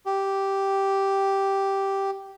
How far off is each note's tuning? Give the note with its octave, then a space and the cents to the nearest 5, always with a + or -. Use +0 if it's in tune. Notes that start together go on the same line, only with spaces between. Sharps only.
G4 -5